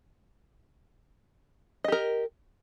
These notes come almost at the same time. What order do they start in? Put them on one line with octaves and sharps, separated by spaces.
D#5 G4 A#4